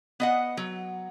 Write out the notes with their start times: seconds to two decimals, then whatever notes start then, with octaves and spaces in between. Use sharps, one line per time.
0.20 B3 D#5 F#5
0.57 F#3